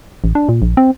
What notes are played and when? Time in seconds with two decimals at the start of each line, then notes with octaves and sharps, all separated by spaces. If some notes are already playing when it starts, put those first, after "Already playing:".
0.24 A1
0.35 D4
0.49 A#2
0.62 A#1
0.77 C4